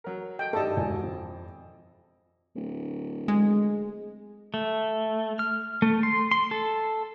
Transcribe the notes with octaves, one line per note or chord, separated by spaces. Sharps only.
F#3 A#4
A4 D#5 G5
G#1 G2 A4 D5 D#5
E1 G#5
F2
D1
G#3
A3
F6
A3
C6
C6
A4